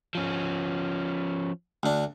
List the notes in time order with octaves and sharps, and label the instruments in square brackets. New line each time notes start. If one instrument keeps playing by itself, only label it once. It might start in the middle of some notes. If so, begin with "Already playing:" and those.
[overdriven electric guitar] F3 C#4
[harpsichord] D2 D4